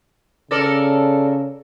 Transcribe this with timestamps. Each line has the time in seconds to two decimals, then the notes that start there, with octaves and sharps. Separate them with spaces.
0.51 C#3 A4 A#4 D5